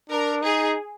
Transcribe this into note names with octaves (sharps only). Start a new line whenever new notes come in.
D4 A#4
D#4 G#4